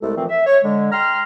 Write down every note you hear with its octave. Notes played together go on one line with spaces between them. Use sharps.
C2 G#3 A3 A4
A#2 E3 F3 A3 C4
E5
C#5
D3 G#3
G5 A#5 C6 F6